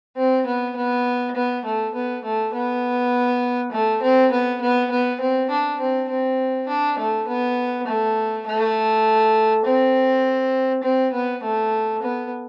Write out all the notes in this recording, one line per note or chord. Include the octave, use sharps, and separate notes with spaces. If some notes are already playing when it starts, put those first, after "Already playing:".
C4
B3
B3
B3
A3
B3
A3
B3
A3
C4
B3
B3
B3
C4
D4
C4
C4
D4
A3
B3
A3
A3
C4
C4
B3
A3
B3